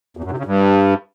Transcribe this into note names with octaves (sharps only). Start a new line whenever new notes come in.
E2
F#2
C3
C#3
G2